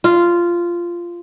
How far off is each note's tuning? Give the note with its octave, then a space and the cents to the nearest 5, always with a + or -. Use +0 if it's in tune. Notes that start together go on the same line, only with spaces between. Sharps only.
F4 -10